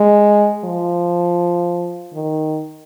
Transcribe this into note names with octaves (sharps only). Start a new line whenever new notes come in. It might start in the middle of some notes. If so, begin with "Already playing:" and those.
Already playing: G#3
F3
D#3